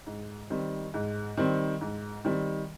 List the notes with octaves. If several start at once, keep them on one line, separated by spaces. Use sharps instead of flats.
G#2
D#3 G3 C4
G#2
D#3 G3 C4
G#2
D#3 G3 C4